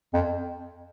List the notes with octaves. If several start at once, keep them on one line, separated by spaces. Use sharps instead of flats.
F2